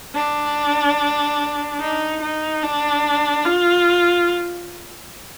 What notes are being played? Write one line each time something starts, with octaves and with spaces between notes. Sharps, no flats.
D4
D#4
D#4
D4
F4